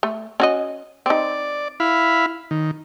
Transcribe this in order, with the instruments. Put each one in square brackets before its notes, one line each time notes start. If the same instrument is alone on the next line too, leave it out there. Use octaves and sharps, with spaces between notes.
[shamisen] A3
C#4 F#4 D#5
[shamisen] C4 D#4 [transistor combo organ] D5
[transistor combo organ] E4 F5 B5
D#3